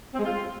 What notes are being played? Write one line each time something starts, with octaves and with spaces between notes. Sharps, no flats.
C4
G#3
F4